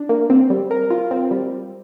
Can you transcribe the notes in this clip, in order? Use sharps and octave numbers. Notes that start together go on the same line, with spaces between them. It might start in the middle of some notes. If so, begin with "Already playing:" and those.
Already playing: D4
A#3
C4
G3
A#4
F4
C4
G3